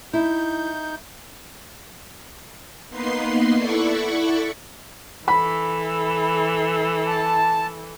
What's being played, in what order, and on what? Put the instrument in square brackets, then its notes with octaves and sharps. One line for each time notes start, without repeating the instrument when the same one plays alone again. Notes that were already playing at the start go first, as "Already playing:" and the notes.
[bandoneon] D#4 G6 [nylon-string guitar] E4
[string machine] A#3 B3 D#4 B4 C6 C7
E4 A4 D5 F#5 B5 C#6
[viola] E3 A4 [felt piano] B5
[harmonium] A5